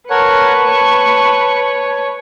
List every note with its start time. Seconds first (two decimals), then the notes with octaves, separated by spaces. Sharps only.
0.10 A#4 B4 C#5 F#5 A5 C#6
0.68 C#5